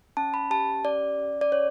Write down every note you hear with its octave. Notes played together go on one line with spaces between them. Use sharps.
C#4 A5
B5
G4 A5
C#4 D5
C#4
D5
C#4 C#5